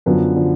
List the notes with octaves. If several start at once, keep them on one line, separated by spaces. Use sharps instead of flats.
F#2 D3 F3 B3 B4
D3 F3